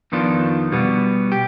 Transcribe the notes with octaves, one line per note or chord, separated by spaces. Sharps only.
F2 D#3 B3 D4 F4
B2 G3 B3
G4